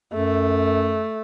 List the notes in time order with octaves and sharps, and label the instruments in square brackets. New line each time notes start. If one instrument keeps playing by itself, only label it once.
[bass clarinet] F#2 [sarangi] A3